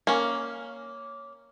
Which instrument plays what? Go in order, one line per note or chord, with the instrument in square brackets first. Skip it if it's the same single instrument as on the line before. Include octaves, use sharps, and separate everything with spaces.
[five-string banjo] A#3 C#4